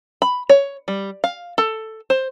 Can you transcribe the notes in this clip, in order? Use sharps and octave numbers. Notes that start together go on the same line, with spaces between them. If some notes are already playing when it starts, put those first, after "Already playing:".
B5
C#5
G3
F5
A4
C5